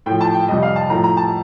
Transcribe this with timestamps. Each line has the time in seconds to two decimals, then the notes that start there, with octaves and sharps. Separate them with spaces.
0.06 A2 G5
0.11 F3
0.21 A5
0.34 G5
0.48 F2 C3 G3 D#5
0.63 F5
0.76 A5
0.90 A2 F3 A#5
1.04 A#5
1.17 A5